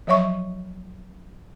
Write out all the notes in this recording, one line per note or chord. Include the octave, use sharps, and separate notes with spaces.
F3 F#3 C#5 E5 C#6